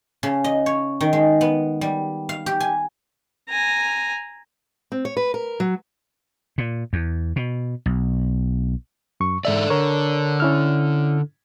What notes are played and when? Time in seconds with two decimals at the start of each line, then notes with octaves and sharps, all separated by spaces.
0.23 C#3
0.44 D#5
0.66 C#5
1.01 D#3
1.13 G#3
1.41 B3
1.81 G3
2.29 F5
2.46 G4
2.60 G#5
3.49 G#5 A#5
4.92 C4
5.05 C#5
5.17 B4
5.34 A#4
5.60 F#3
6.58 A#2
6.93 E2
7.36 B2
7.86 B1
9.20 F#2 C#6
9.45 G#2 D#4 A4 D5 E5
9.70 D3 A#4 C#5
10.40 C#4 E4 F6